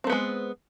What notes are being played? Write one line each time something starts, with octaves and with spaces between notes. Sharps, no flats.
G#3 A3 B3 C4